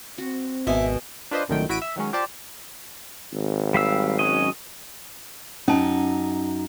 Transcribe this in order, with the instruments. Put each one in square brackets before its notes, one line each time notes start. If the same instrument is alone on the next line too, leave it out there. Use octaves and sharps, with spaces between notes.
[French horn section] C4 [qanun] F#4
[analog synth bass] G#1 [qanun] B2 G#5 [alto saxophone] E5
[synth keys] D4 F4 B4 C5 D#5
C2 F#2 A#2 D#3 A3 G5
A1 E4 F#4 B6 D7 D#7
E5
D#3 F#3 G#3 C#4
F4 G4 C5 D5 A5
[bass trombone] G#1
[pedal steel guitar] G3 F5 E6
F#3 C#4 D#5
[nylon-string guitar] F#2 D#4 F#5 [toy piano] C#4 A5